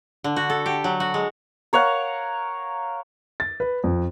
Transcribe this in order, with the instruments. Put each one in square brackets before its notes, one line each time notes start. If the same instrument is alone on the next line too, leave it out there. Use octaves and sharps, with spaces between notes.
[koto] D3
F#4
A4
G4
F#3
F#4
G#3
[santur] A#4 C#5 F5 F#5
[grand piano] A6
B4
F2